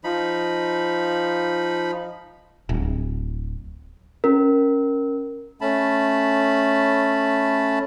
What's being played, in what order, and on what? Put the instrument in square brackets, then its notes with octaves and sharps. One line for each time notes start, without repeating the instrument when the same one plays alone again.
[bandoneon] F3 D#4 B5
[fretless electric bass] D1
[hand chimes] C#4 A#4
[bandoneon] A3 C#4 A5 B5